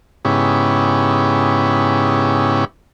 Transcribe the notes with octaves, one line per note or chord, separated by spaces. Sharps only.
G#2 C#3 B3 C#4 E4 G4